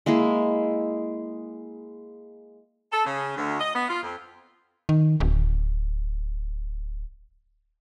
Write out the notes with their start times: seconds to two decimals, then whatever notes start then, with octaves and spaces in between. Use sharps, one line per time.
0.06 G#3 A#3 E4 G#4
2.91 A4
3.05 C#3
3.36 D2
3.60 D#5
3.75 B3
3.89 F4
4.02 F2
4.89 D#3
5.20 D1